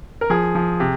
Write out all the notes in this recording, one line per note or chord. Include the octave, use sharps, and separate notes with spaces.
A#4
F3 G#4
F3
C3